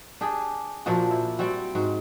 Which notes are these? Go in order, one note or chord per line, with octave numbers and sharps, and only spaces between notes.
D4 G4 G#4
A#2 F3 D4 F#4
E4
G3 C4 F#4
G#2 F#4